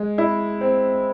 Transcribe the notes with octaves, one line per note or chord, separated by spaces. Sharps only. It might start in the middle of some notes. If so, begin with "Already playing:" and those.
Already playing: G#3
E4
C4